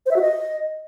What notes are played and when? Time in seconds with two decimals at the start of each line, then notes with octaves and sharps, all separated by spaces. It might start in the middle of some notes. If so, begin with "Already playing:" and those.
0.06 C5
0.11 E5
0.16 F#4
0.21 D#5